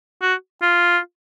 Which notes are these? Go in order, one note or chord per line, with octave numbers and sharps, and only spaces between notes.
F#4
F4